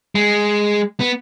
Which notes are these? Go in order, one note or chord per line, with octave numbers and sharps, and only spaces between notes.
G#3
B3